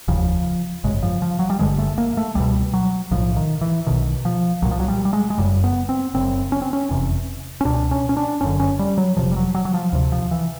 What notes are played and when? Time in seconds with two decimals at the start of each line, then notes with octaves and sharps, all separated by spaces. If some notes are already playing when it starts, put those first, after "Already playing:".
0.08 F1 D#2 C#3 F3
0.84 G#1 F#2 C#3 G#3
1.03 F3
1.22 F3
1.39 F#3
1.50 G3
1.59 G1 G2 D3 G#3
1.78 A3
1.98 A#3
2.17 A3
2.35 C#2 B2 G3
2.74 F#3
3.11 B1 A2 F3
3.36 D#3
3.61 E3
3.86 B1 B2 D#3
4.25 F3
4.62 C2 A#2 F#3
4.71 F3
4.80 F#3
4.88 G3
5.05 G3
5.13 G#3
5.30 G#3
5.38 F#1 F#2 C#3 G3
5.64 B3
5.89 C4
6.14 F#1 F#2 C#3 C4
6.52 C#4
6.62 C4
6.73 C#4
6.91 F1 E2 C3
7.61 C#4
7.65 C#2 B2 D4
7.91 C#4
8.09 C#4
8.17 D4
8.41 F#1 F#2 D3 C#4
8.60 C#4
8.79 G3
8.98 F#3
9.17 F2 C3 F3
9.21 F1
9.31 G3
9.36 F#3
9.55 F#3
9.65 F#3
9.74 F3
9.93 D2 C3
10.12 F3
10.31 E3